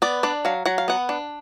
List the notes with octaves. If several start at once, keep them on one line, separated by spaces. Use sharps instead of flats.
B3 D5
D4 D5
F#3 F5
F#3 F#5
F5
B3 F#5
D4